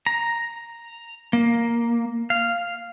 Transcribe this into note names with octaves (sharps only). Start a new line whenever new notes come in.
A#5
A#3
F5